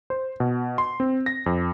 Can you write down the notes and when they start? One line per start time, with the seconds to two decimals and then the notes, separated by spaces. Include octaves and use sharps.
0.10 C5
0.40 B2
0.78 C6
1.00 C4
1.26 A#6
1.46 F2